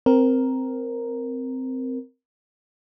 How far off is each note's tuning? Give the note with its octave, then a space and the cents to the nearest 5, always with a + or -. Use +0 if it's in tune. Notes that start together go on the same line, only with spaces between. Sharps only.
C4 -10 A#4 +0